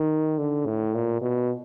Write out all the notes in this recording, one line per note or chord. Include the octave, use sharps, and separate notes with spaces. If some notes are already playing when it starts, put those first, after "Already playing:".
Already playing: D#3
D3
A2
A#2
B2